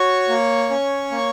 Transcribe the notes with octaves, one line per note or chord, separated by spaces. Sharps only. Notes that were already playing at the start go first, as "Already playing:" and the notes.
Already playing: F#4 C#5 C#6
A#3
C#4
A#3